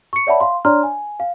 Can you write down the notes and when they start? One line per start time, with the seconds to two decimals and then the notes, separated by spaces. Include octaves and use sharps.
0.13 C#6 C#7
0.27 C#5 D5 E5 F#5 A5 B5
0.40 F5 C6
0.65 D4 C#5 D5 A#5 C6 F6
0.83 G#5
1.20 F5